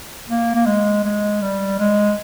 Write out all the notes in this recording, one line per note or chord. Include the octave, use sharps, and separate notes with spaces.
A#3
A#3
G#3
G#3
G3
G#3